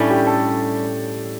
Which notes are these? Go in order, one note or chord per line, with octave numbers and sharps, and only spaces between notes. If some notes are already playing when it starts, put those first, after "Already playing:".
Already playing: A2 G3 C#4 D4 E4
G4
A4